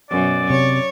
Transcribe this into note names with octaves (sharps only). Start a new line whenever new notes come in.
F#2 B2 D5
C3 C#5